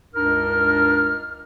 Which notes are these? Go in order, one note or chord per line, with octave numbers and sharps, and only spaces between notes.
C#2 G2 D4 D#4 A#4 F6